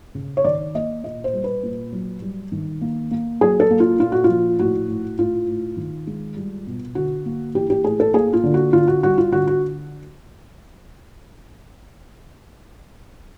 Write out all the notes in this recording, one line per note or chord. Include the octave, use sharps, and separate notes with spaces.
C#3
C#5
D#3 D5
A#3 D#5
A#2 D#5
C5
G3
B4
A#2
F#3
G3
D#3
A#3
A#3
F#3 G#4
A4
A#3
F4
A#2 F4
F#4
F3 F4
A2 F#4
A2
A2 F4
A2
D#3
G#3
G3
B2
D3 F#4
A#3
E3 G4
G4
A2 G#4
A4
A#3 G#4
F4
D3
F#4
D3 F4
F#4
G3 F#4
F4
D3 F#4
F#4